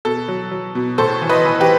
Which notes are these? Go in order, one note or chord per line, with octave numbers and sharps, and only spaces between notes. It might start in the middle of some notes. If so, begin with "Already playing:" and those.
B2 A4
F#3
F#3
B2
A2 A4 C5
E3
B4 D#5
E3
G4 B4